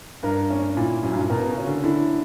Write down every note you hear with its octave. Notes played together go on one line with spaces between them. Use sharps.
G2 A#4
C#4
A#2 E4
F#2 F#3
G2
A#2
B2 A#4
C#3
C#4
D3
D3 E4